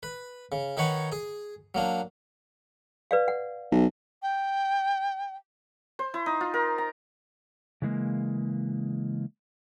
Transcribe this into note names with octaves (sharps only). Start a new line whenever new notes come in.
B4
C#3
D#3 D#4 B4 C#5 F#5 G#5
G#4 G#5
F#3 A#3 D4
B4 D5 F5
F#5
B1
G5
C5
E4
D#4
F4
A#4
A#5
C#3 E3 G#3 A#3